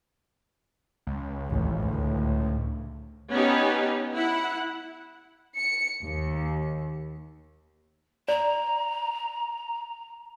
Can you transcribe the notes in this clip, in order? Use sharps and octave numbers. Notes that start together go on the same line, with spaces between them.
C#2
A1 D#2
D2 A2
B3 C#4 D#4 G4
E4 F#5
C#7
D#2
D5 A#5